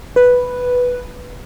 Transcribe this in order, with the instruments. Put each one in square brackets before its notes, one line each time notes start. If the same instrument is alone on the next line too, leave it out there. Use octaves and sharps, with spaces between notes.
[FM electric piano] B4